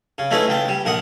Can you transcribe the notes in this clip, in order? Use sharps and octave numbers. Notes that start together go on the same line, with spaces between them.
C#3
G#3 A3 C#4 D#4 E4 B4
C#2 G5 A5
G3
A#1 A#4 F#5 D#6